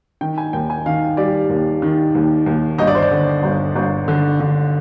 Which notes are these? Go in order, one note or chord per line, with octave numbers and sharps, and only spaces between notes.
D#3 G5
G#5
D#2 G5
G#5
D#3 F5
G3 D5
D#2
D#3
D#2
D#2
G1 D#5
D5
C5
D5
D3
G1
G1
D3
D3